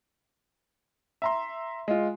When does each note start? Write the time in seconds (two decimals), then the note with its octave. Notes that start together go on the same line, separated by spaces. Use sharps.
1.22 E5 A#5 C6
1.88 G#3 F4